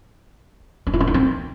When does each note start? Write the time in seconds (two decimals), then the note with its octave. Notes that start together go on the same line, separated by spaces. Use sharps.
0.87 C#4
0.94 E4
1.00 C#4
1.07 D#4
1.14 C4